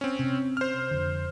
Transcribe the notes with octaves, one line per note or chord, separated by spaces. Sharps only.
C4 C#4
C3
C5 F6
F2 D3